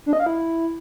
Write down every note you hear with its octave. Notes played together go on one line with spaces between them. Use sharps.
D4
D#5
F5
E4